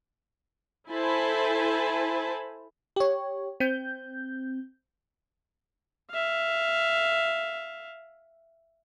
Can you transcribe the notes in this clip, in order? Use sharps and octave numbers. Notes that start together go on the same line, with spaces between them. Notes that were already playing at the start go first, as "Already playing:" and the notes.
E4 A4 C5 G#5 A5 B5
G4 C#5
C4 G6
E5 F5